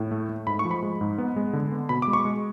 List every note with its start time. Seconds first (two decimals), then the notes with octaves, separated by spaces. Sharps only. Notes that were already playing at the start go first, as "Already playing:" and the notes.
Already playing: A2
0.11 A3
0.29 A3
0.47 G#2 B5
0.59 C#6
0.65 F3
0.71 B5
0.83 G#3
1.01 G#2
1.18 B3
1.36 G#3
1.53 D3
1.72 B3
1.89 B2 B5
2.02 D6
2.07 G#3
2.13 C#6
2.25 G#3